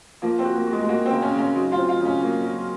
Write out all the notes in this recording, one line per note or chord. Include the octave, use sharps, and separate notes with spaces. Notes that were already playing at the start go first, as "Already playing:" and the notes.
F3 A#3
C4
F#4
A#3
F#4
G#3
G#3
A#3 F#4
C4
C#3
C#4
C#3
C#4
F#3 D#4
F4
C4
F4
C#3 C#4
F#3 A#3
F#3